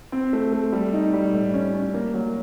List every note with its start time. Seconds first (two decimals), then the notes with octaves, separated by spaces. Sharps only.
0.12 C4
0.33 A3
0.52 A3
0.72 G3
0.93 D#4
1.13 G3
1.33 A2
1.54 C#4
1.74 C#4
1.94 A#3
2.14 F#3